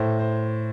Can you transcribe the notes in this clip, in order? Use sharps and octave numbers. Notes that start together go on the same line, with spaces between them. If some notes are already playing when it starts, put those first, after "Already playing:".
Already playing: A2 C5
C5